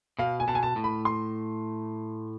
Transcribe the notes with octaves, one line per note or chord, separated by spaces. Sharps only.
B2 F5
G#5
B2 A5
G#5
A5
A2
B5
C6